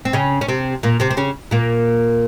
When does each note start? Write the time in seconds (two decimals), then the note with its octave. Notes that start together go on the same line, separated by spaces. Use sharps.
0.05 C4
0.13 C#3 C#4
0.41 C#4
0.48 C3 C4
0.83 A#2 A#3
1.00 C3 C4
1.11 C4
1.17 C#3 C#4
1.51 A#2 A#3